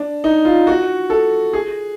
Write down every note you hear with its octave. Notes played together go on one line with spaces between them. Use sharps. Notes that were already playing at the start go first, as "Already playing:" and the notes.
Already playing: D4
D#4
F4
F#4
A4
G#4